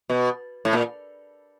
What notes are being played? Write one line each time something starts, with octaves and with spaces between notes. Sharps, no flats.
B2
A2
A#2